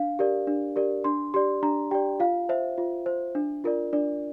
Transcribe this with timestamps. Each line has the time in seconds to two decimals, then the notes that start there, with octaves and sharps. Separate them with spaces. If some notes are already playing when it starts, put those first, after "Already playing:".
Already playing: D4 F5
0.19 G4 A#4 D5
0.47 D4
0.76 G4 A#4 D5
1.04 D4 C6
1.34 G4 D5 C6
1.63 D4 A#5
1.91 G4 D5 G5
2.20 F4 F5
2.49 C5 E5
2.78 F4
3.06 C5
3.35 D4
3.64 F4 A#4 D5
3.93 D4 D5